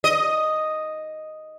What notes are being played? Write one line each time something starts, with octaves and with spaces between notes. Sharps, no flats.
D#5